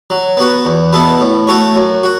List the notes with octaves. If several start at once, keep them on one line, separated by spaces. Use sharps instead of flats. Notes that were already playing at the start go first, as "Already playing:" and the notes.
F#3
B3 F#4
E2
B2 B3 E4 A4
A2
A3 F#4 A4 C#5
F#2
F#4